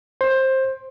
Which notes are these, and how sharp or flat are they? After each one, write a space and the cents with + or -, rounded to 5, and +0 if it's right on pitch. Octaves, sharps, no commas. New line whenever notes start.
C5 +15